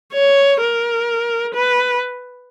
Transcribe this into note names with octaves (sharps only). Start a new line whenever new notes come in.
C#5
A#4
B4